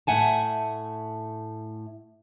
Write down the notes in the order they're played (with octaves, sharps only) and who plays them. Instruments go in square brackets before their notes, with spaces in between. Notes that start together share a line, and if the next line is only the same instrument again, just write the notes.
[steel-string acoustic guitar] A2 A3 E5 F#5 G#5 A5